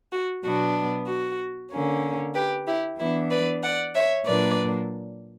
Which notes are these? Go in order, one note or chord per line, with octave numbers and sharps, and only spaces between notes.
F#4
B2 F#3 B3 D4 F#4
F#4
D3 A#3 C#4
G4 B4
E4 G4
E3 B3 D4 E4
B4 D5
D5 F#5
C#5 E5
A#2 F#3 A#3 D4 B4 D5